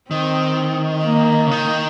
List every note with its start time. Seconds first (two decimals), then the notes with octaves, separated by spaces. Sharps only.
0.10 D#3 C4
1.04 A#3
1.47 C#3
1.51 D#3